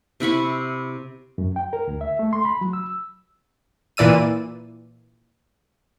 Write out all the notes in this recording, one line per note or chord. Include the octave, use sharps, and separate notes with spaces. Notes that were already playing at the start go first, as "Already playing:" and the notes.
C3 E4 B5 C#6
F#2
G5
A#4
D2
E5
A3
C6
B5
F#3
E6
A#2 E3 D5 E6 D#7